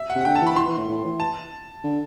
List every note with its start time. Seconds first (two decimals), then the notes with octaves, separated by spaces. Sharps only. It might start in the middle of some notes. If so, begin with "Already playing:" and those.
Already playing: E5
0.10 F#5
0.15 C3
0.21 F#5
0.25 D3 G5
0.35 A5
0.42 E3 B5
0.56 E3 C6
0.68 E3
0.78 A2
0.89 A2
1.05 E3
1.20 A5
1.84 D3